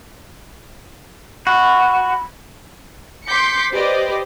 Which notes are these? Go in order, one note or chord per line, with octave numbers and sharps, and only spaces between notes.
F#4 B5
C6 D6 G6 B6 C#7
G4 B4 C5 D5 D#5